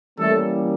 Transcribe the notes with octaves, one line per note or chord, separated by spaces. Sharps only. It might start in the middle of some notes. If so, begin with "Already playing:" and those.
E3 G3 A3 A#3 C#4 A4